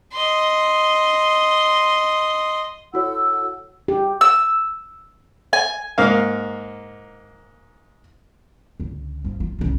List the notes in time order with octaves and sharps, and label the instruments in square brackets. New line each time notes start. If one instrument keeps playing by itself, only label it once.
[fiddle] D#5 C6
[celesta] E4 F#4 C#5 [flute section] A4 F#5 E6
[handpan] G4
[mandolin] E6
G#5
[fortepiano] G#2 A#3 F5
[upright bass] C#2 D3
G2 F3
F4
C2 C#3